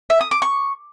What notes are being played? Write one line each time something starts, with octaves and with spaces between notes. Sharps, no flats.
E5
D#6
D6
C#6